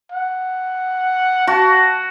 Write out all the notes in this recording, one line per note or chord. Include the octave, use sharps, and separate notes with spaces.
F#5
F#4 A5